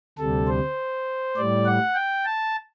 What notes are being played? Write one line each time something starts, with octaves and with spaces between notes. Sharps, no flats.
D2 C3 G3 A4
C5
A2 G3 D5
F#5
G5
A5